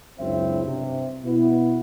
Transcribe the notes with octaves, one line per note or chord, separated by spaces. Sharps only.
C#2 F#2 C4 D4 E4 E5
G2 C3
B2 B3 E4